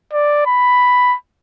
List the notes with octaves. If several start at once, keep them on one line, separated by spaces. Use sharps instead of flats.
D5
B5